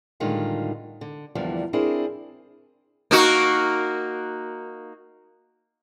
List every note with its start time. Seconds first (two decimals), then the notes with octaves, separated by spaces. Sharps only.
0.20 A2 D3 D#3 G3 G#3 F4
1.01 D3
1.35 E2 D3 F3 G3 A#3 D4
1.73 C4 D4 E4 G#4 A#4 C5
3.11 A#3 D#4 F#4